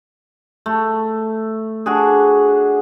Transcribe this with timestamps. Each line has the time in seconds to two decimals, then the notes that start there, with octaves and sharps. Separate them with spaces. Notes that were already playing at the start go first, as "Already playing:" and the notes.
0.66 A3
1.86 D4 F#4 G#4